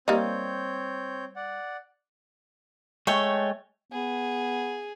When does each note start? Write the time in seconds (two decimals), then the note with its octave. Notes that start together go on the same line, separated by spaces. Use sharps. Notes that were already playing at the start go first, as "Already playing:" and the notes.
0.08 G3 A#3 C4 D#4 C#5 G6
1.36 D5 F#5
3.07 G#3 A3 C#5 G5
3.92 B3 G#4